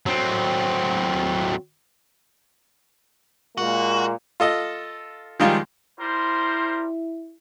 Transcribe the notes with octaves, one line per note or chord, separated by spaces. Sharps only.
F#3 C4
A#2 G#3 A#3 F#4
F4 A4 D#5
D#3 F3 G3 G#3 D#4 F4
G3 E4 A#4 C5